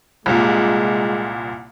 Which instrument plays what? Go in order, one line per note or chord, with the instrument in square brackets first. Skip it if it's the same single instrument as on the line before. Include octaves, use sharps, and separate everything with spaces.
[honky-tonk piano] C2 A#2 [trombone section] G#3